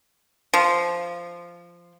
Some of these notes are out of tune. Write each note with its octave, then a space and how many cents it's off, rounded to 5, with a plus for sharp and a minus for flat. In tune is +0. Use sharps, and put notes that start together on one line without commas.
F3 -10